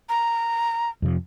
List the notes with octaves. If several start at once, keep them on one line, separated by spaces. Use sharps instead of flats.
A#5
F2 C3 F3